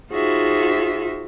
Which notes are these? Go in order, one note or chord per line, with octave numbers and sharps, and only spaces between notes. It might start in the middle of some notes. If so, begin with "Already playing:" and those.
D#4 F4 F#4 G#4 C5 E5